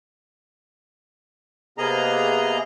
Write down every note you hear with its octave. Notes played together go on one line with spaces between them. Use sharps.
C3 A#3 B3 G#4 D#5 A#5